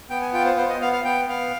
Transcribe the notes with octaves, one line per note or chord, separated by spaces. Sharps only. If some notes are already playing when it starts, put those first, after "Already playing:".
B3 G5
G#5
F4 G5
C5
B3 C5
D#5
B3 F5
F5
B3 G5
B3 F5